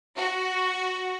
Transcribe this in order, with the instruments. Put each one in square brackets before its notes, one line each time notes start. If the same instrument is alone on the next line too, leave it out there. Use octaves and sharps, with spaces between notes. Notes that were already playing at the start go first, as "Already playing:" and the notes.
[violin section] F#4